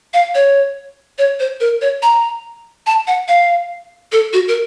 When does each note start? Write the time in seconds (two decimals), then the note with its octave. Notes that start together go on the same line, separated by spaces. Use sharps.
0.14 F5
0.35 C#5
1.18 C#5
1.40 C5
1.60 A#4
1.81 C#5
2.02 A#5
2.87 A5
3.07 F#5
3.28 F5
4.12 A4
4.33 F#4
4.48 A#4